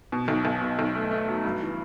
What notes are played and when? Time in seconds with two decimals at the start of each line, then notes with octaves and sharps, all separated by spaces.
0.12 B2
0.28 B1
0.45 B1
0.61 B2
0.79 B1
0.95 A3
1.11 A3
1.28 F#3
1.44 G2
1.61 E3